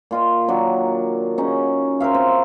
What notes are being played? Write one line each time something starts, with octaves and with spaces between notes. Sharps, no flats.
A#2 F4 D#5
D#3 F#3 D4
C#3 C#4 D#4
A#4 C5 E5 F5
C4